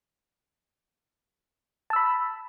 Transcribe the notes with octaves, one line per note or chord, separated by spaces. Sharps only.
A5 B5 E6